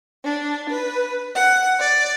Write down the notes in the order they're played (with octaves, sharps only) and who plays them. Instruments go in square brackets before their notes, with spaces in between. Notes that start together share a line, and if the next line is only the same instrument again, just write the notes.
[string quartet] D4
B4
F#5
D5